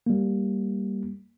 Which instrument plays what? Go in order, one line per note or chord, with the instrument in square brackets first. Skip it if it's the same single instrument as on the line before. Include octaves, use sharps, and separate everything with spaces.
[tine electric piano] G3 A#3